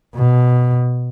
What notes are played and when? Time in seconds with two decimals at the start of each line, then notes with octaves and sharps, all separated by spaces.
0.15 B2